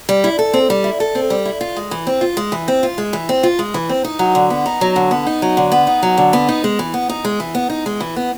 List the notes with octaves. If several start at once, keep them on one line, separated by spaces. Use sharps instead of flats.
G3
E4
A4
C4
G3
E4
A4
C4
G3
E4
F4
G#3
E3
C4
F4
G#3
E3
C4
F4
G#3
E3
C4
F4
G#3
E3
C4
D#4
F#3
D3
B3
D#4
F#3
D3
B3
D#4
F#3
D3
B3
D#4
F#3
D3
B3
D#4
G#3
E3
B3
D#4
G#3
E3
B3
D#4
G#3
E3
B3